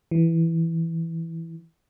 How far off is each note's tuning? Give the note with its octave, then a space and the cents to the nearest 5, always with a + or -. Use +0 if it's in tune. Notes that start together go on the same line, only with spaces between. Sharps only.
E3 +0